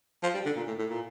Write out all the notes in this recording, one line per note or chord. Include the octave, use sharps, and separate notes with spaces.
F3
G3
D3
A#2
A2
A2
A#2